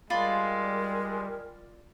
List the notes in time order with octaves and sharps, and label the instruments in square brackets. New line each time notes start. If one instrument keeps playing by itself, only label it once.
[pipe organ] G3 [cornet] G#3 [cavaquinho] F4 D5 B5 [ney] A#4